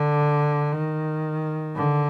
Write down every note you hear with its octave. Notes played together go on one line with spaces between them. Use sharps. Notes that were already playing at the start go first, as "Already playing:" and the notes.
Already playing: D3
D#3
D3